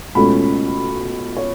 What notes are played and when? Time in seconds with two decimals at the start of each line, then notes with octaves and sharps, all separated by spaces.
0.15 C#2 B2 A3 C#4 B5
1.37 C#5